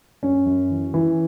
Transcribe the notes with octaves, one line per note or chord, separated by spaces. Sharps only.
F#2 C#4
F#2
E3
E3